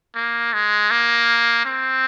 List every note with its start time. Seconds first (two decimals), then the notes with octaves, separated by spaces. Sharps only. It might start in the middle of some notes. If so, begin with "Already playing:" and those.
0.15 A#3
0.54 G#3
0.91 A#3
1.65 C4